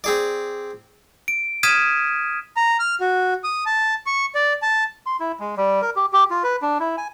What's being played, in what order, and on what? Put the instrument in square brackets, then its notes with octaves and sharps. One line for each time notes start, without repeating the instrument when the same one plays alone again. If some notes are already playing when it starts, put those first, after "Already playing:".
[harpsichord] C4 G#4 D5
[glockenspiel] D7
D#6 F6 G#6 B6 D#7 E7
[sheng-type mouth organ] A#5
F6
F#4
D#6
A5
C#6
D5
A5
[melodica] C6
E4
G#3
G3
A#4
G4
G4
F4
B4
D4
E4
G#5